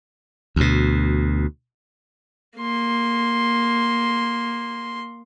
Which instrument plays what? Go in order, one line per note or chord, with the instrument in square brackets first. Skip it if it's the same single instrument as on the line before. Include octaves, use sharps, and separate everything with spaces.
[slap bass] D2 B2
[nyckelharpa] A#3 C6